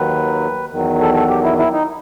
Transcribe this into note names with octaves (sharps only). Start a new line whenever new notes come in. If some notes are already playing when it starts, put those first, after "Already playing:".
Already playing: D#2 D#3 F#3 B4
E2 D#3 F#3
A4
A4
G4
E4
E4
D#4